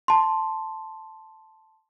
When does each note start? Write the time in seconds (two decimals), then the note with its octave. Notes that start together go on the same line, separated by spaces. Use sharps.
0.08 A5 C6